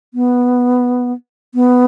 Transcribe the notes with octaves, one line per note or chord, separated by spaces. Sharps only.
B3
B3